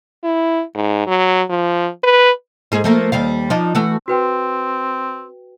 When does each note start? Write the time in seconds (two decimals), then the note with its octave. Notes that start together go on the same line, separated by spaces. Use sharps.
0.24 E4
0.75 G#2
1.07 F#3
1.50 F3
2.04 B4
2.72 G#2 G#4
2.84 F3 A3 A#3
3.12 D#2 G3 F5
3.50 F3 D4 D#4
3.75 E3 A3 F#4
4.08 C4 F#4 B4 G5